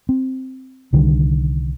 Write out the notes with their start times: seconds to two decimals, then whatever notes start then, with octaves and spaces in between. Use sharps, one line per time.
0.09 C4
0.93 C2 D3 D#3 G3